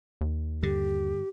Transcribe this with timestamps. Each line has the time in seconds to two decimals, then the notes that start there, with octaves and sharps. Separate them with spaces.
0.21 D#2
0.63 G2 D3 G4